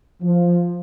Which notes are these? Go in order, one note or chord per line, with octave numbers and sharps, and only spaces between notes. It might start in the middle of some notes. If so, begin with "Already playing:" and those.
F3